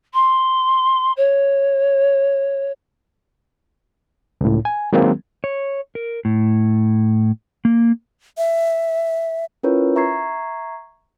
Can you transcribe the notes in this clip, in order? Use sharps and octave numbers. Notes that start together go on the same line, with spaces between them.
C6
C#5
C#2 A2
G#5
D#3 F#3 G#3 A#3 C4
C#5
A#4
A2
A#3
E5
C#4 E4 F4 A#4 B4 C#5
E5 A#5 C#6 G#6 C7